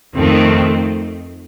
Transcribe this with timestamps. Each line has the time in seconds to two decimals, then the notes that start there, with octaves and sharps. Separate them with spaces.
0.16 F2 D#3 A3 C4